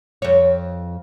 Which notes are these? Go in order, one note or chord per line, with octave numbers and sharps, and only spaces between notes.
F2 C#5